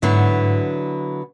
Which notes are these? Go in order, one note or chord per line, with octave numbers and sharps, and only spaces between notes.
G#2 D3 F#3 B3 E4